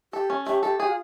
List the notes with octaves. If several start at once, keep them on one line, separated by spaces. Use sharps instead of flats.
G4 A4
C#4
A3 G4
G4 A4
G4 G#4
F4